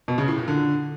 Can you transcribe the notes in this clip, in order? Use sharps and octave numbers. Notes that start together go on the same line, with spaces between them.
B2
C#3
A2
A#2
D3